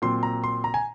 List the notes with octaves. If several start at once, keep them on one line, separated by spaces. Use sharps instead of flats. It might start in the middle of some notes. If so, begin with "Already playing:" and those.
A#2 F#3 C4 C6
A#5
C6
A#5
G#5